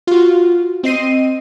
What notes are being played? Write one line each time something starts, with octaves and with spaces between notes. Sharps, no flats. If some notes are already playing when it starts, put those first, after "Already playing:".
F4 F#4
C4 D#5 C7 D#7